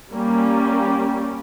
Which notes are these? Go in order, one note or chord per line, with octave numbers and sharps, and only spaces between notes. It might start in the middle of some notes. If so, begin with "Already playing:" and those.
G3 A#3 C#4 G4